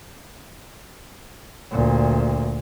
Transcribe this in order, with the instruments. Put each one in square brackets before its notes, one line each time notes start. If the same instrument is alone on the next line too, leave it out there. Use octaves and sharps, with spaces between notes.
[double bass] D2 A#2